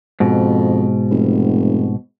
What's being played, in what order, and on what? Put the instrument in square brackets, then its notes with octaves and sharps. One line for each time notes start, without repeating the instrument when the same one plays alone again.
[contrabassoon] F2 [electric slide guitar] G#2 B2
[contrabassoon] F1